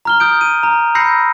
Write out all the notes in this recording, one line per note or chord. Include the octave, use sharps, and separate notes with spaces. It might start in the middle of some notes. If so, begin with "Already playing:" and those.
A#5 F6 G7
D#6 G6 D7
D#7
A#5
B5 E6 G6 A#6 C7 C#7